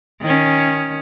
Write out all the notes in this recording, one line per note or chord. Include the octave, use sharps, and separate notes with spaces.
D#3 C#4